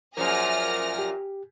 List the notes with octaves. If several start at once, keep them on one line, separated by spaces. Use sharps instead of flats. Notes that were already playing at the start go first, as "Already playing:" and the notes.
F#2 A#2 F3 G#4 A#4 C5 F6 A#6
G4